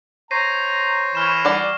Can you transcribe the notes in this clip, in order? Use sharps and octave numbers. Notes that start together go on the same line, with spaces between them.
C5 C#5 A#5 A#6 C7 D#7
E3 B5 C#6 F6 E7
G3 D5 F#5